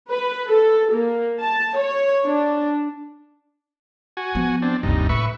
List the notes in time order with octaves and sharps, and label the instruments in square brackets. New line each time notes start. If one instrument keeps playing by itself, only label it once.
[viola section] B4
A4
A#3
A5
C#5
D4
[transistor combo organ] F#4 G#5
[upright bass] F3 B3
[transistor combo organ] C4 D4
[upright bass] F#1 D2 [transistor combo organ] G2 C3 D#4
[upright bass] A2 [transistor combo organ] B4 E5 C#6